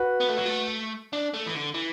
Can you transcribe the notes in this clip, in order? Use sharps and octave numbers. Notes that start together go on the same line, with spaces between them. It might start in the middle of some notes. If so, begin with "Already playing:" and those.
Already playing: F#4 B4
B3
A3
F#3
A3
D4
A3
E3
D3
E3